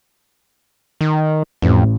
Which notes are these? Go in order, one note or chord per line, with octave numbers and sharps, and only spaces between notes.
D#3
A1 F2